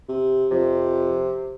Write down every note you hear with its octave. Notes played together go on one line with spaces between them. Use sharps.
C3
F2 C3